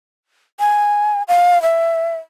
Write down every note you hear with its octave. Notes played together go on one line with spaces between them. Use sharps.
G#5
F5
E5